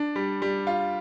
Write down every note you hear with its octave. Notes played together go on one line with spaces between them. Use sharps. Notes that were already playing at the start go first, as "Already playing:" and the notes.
Already playing: D4
G3
G3
F4